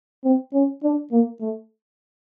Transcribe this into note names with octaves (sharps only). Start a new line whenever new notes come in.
C4
C#4
D4
A#3
A3